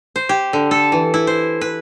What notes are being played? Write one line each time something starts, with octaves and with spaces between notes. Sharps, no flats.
C5
G4
D3
A4
E3
E4
C5
B4